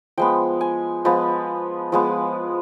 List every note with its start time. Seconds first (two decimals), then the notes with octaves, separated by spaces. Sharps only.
0.18 F3 G#3 B3 G5
0.61 G#5
1.05 F3 G#3 B3
1.92 F3 G#3 B3